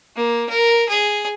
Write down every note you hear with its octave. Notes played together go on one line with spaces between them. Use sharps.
A#3
A#4
G#4